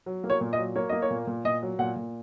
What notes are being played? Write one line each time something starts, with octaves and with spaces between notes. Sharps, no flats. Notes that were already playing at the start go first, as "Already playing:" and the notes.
F#3
A#3
C#5
A#2
D#5
F#3
A#3 C#5
A#3 D#5
C#5
A#2
A#2
A#2 D#5
F#3
A#2 F#5
A#2